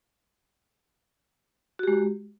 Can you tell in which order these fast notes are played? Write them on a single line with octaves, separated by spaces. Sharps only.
F#4 G4 G#3